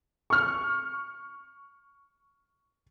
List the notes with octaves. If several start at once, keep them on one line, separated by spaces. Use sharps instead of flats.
C#6 F6